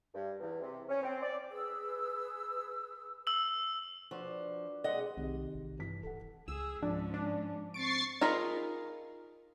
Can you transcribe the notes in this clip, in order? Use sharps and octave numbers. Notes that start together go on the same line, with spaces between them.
G2
E2
C3
C#4
C4
D5
G#4 B4 E6
E6 F#7
F3 D4 F#4 B4
G#3 C4 D#5 F#5
B1 C3 D#3 G4
A1
G2 E3 B6
D1 A4 F#5
C#2 G#4 E6
G#2 F3 C#4 D4
D4
C4 C#6 A6 C7 D7
D#4 F4 G#4 A#4 B5